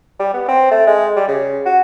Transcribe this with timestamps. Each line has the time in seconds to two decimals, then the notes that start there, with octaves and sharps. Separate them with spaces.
0.19 G3
0.34 B3
0.49 C4
0.71 A3
0.87 G#3
1.16 G3
1.28 C#3
1.66 F#4